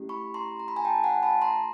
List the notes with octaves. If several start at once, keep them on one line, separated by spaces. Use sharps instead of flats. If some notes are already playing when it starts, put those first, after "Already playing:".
Already playing: A3 C#4 E4 G4
B5 C#6
A#5 C6
A#5
B5
G#5 A#5
G5 A5
F#5 G#5
A5 B5
A#5 C6